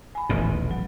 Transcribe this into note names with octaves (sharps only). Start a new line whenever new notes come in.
G#5 B5
D#1 A1 B2
F#3